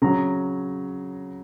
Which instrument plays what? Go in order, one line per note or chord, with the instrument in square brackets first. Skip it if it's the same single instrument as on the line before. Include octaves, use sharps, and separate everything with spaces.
[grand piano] C#3 F#3 A#5